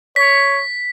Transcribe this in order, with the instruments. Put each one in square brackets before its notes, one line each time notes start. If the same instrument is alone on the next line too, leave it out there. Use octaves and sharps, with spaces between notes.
[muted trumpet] C#5 [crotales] B6